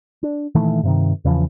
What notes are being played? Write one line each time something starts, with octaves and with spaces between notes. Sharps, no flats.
D4
A#2 D#3 E3 A3
G2 C3 D#3
E2 C#3 E3 F3